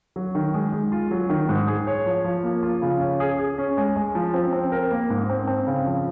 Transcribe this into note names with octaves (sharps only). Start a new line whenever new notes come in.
F#3
D#3
G#3
G#3
F4
F#3
D#3
G#2
G#4
C#5
F3
F3
A#3
F4
C#3
C#4
G#4
G#4
C#4
G#3
G#3
F3
C4
C4
A#4
A#3
G#2
C4
C4
C#3
F3